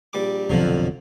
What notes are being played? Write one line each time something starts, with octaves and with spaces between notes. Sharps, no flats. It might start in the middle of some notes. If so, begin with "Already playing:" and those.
A#1 G3 D6
F1 B1 F2 D3 F3 F#3